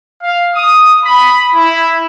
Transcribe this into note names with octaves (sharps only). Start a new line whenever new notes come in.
F5
D#6
B5
E4